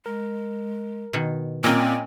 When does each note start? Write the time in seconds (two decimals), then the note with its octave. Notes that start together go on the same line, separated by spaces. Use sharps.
0.06 G#3 A#4
1.13 B2 D#3
1.64 A#2 A#3 C4 C#4 D#5 G5 G#5